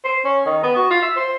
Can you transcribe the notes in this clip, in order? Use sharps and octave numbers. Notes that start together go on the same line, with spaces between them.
C5
C#4
D#3
B3
F#4
F4
E5
C5